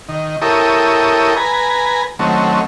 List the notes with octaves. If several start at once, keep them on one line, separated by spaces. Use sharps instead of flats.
D#3
E4 G4 A4 A#4 C#5 D#6
B4 G#5 A#5
D#3 F#3 A3 C4 C#4